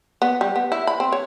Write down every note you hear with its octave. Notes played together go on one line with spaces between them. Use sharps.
B3
G3
B3
E4
B5
C4
C#5